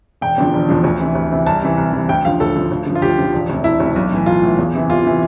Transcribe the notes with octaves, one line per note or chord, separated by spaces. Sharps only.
E1 G5
E2 D3 F3
E1
E2 D3 F3
D2
C3 E3
D2
C3 E3
C2 A5
C3 E3
C2
C3 E3
D2 G5
D3 F3 F5
D2 A4
D3 F3
D2
D3 F3
F4
D2 G4
D3 F3
E1
D2 C3
E1 E4
D2 C3
B1
A2 E3
B1 F4
A2 E3
E2
C3 E3
E2 F4
C3 E3